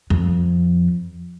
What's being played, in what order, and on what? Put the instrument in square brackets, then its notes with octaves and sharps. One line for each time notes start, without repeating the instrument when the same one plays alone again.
[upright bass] F2